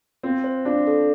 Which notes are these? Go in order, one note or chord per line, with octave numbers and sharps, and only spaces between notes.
C4 F4
C5
D4 F4
A4